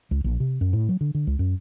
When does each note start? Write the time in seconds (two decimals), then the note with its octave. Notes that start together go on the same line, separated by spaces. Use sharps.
0.11 C#2
0.24 A#1
0.40 C3
0.61 F#2
0.73 A2
0.89 F#3
1.01 D3
1.15 D3
1.27 C#2
1.39 F#2